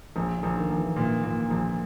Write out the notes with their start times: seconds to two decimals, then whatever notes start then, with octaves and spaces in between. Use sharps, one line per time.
0.16 A#1 C#3
0.37 D3
0.43 A#1
0.56 D#3
0.70 A#1
0.77 E3
0.96 A#2 E3
1.23 A#2
1.50 A#1